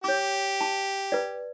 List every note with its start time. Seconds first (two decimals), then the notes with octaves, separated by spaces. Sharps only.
0.04 G4 C#5 D6
0.61 A5
1.12 B4 D5